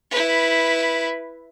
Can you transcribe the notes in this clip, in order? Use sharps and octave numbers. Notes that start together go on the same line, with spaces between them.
E4 B4